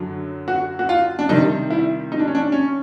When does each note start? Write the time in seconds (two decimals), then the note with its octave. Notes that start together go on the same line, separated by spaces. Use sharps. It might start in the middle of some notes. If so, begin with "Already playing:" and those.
Already playing: F#2 D3 F#3
0.48 F#4
0.79 F#4
0.89 F4
1.19 D4
1.29 C3 D#3 G3 D#4
1.70 E4
2.12 D#4
2.19 D4
2.27 C#4
2.35 D4
2.52 C#4